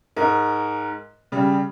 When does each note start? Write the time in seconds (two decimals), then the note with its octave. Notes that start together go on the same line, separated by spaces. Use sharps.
0.16 G#2 A#4
1.32 C#3 G3